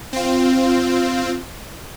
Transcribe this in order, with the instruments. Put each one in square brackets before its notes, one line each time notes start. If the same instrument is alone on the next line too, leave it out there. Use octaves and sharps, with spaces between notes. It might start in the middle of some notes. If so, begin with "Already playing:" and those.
[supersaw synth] C4 F4